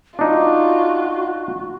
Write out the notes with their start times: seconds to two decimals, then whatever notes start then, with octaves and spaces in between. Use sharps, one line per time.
0.19 D4 D#4 F4 F#4